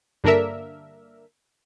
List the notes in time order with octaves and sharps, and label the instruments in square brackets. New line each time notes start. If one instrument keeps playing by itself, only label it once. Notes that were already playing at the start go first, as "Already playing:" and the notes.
[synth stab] G2 D3 A#3 D4 A#4 E5